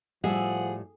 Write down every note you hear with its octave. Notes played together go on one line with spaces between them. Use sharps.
A2 F3 G3 G#4 E5 F#5